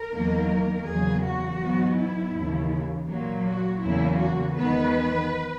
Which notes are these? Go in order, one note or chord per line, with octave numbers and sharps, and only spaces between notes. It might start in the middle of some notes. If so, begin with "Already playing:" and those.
Already playing: A#4
E2 D#3 F#3 A#3
E2 C#3 F#3 A#3 G#4
F#4
G#2 F#3 B3
E4
D#2 C#3 E3
A#2 F#3 A#3
F#4
E2 C#3 F#3 A#3 E4
F#4
E2 D#3 G#3 B3 B4